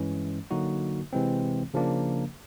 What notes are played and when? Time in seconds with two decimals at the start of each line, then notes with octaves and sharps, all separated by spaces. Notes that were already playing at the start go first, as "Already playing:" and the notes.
Already playing: G2 E3 G#3 C#4
0.51 D3 F#3 A#3 D#4 F#4
1.13 C3 E3 G#3 C4
1.74 C#3 F3 A#3 D4